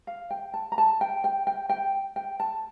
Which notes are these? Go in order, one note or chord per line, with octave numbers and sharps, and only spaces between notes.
F5
G5
A5
A#5
A5
G5
G5
G5
G5
G5
A5